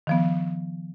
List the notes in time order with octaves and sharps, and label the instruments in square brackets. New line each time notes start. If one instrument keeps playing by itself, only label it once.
[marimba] D#3 F3 B3